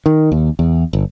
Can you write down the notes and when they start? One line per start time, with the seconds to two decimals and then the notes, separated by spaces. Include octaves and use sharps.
0.06 D#3
0.32 D#2
0.59 E2
0.93 G1